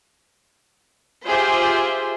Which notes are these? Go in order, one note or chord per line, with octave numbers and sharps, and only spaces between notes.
F4 G4 G#4 C5 E5